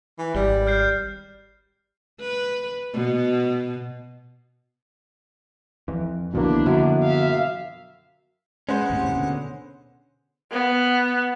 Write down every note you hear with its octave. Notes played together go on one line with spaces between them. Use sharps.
E3
G#1 G3
F6 G6 C7
B4
B2
F2 E3
B1 F2 B2 D3 D#3 A#3 D4 E4
F#2 D3 F3 B3
E5 F5
G#3 C#4 B4 C5 F#5
D#2 A2 C3
B2 D3
B3